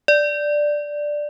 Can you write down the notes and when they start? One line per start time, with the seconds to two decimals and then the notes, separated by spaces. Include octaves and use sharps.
0.08 D5